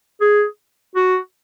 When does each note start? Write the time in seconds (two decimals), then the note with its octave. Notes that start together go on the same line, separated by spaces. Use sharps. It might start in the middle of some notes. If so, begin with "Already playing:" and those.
0.21 G#4
0.96 F#4